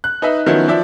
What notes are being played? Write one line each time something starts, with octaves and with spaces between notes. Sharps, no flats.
F#6
D#4 B4 D#5 E5
D#3 F3 F#3 B3 C#4 E4
F3 D5 E5